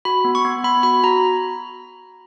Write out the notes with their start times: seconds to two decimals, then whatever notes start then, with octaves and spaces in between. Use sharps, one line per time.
0.05 F#4 B5
0.24 B3
0.35 C#6
0.45 B3
0.64 B3 B5
0.83 F#4 B5
1.03 F#4 A#5